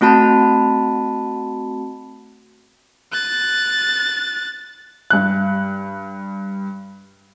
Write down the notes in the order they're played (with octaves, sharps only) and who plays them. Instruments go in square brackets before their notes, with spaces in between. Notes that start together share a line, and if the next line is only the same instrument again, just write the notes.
[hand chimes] A3 C4 F#4 A5 B5
[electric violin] F#6 A6
[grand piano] G2 F#6